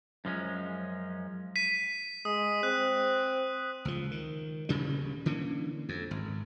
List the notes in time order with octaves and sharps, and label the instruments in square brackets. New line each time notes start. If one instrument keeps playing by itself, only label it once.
[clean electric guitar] F#2 F3 G#3 C#4
[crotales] B6 D#7
[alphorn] G#3 [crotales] D#6
[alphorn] C4 [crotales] F#6
[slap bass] C#2 F3
D#3
D#1 D2 C#3 G3
D3 E3 A#3 C#4
F2
G#1